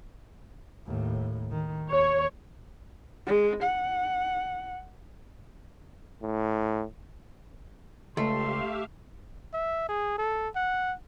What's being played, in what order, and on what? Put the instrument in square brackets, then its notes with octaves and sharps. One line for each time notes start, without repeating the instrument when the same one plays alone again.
[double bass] D#2 A2
D#3
[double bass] D#2 [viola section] C#5
[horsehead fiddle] G#3
F#5
[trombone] A2
[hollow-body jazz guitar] C#2 [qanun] A3 [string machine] G4 E5 F5 [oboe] C6
[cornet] E5
G#4
A4
F#5